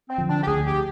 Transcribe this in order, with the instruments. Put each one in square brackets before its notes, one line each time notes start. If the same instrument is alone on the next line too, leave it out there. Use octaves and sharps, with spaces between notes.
[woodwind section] C4
[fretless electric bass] D3 F3
[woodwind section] D4
G4
[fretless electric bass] D2 [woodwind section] G#4
[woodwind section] G4